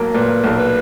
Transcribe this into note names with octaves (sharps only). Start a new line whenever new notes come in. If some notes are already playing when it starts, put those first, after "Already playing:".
Already playing: B1 F#3 A#3
A#2 B4
B1
B4